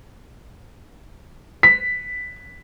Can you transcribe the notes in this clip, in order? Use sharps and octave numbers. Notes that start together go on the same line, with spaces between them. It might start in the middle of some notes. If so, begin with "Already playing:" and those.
B6